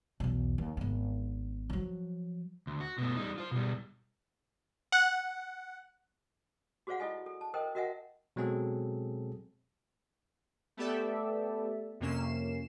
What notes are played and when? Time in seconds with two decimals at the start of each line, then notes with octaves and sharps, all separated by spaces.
0.20 B1 E2
0.58 D#2
0.77 G#1 B3
1.70 F3 F#3
2.67 D2
2.80 F#4
2.98 B2 A3
3.17 G3 D#4
3.38 F4 C5
3.51 B2 G3
4.92 F#5
6.87 F#4 G#4 C5 D5 F5 F#5
7.00 E4 F4 A4 D#5 G#5
7.26 A4
7.41 A5
7.54 A4 A#4 C5 D#5 G5
7.75 F#4 A#4 D#5 E5 F#5 G#5
8.36 B2 F#3 G#3 C4 G#4 A4
10.77 A3 B3 G4 A4 D5 E5
12.00 F2 C3 A#3 C#4 C7 E7